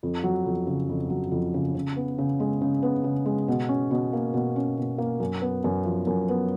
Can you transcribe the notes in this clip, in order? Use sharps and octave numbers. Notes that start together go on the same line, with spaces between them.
F2
F#3
F2
C#3
F2
F#3
F2
C#3
C#3
B3
C#3
G#3
C#3
B3
C#3
G#3
B2
C#4
B2
A#3
B2
C#4
B2
A#3
F#2
B3
F#2
F3
F#2
B3